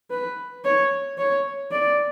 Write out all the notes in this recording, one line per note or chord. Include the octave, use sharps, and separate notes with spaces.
B4
C#5
C#5
D5